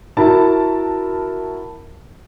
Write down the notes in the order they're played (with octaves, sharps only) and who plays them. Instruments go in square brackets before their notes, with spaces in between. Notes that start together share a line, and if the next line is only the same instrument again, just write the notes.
[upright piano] E4 F#4 A#4 A5 B5